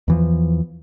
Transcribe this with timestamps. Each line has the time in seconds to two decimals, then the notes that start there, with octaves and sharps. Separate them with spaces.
0.08 E2 E3 F3